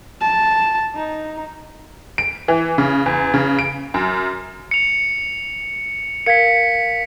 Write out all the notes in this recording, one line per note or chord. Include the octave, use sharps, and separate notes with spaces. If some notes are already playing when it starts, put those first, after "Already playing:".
A5
D#4
D7
E3
C#3
E2
C#3
D7
F#2
C#7 F7
A#4 F5 G#6 B6 C#7